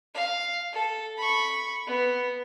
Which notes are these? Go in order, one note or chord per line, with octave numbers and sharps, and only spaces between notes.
F5
A4
B5 C#6
B3